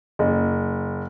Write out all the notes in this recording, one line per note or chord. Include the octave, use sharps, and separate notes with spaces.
F#1